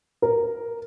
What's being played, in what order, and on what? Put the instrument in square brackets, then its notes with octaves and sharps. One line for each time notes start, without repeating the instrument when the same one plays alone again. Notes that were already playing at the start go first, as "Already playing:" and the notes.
[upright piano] A#4